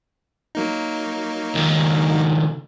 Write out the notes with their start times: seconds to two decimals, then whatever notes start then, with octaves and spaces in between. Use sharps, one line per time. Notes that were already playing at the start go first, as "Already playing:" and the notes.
0.55 F#3 A#3 D#4
1.55 C#2 D#3